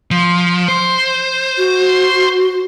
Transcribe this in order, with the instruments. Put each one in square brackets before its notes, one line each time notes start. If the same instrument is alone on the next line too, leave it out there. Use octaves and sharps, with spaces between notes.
[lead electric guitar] F3
C5
[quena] F#4